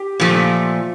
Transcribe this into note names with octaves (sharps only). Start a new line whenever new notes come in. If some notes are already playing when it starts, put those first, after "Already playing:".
Already playing: G4
A#2 F3 A3